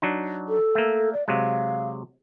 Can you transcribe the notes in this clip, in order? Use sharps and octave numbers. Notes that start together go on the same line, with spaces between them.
F#3 D4 D#4
A4
A3 A#3
D5
C3 F#3 G#3 F5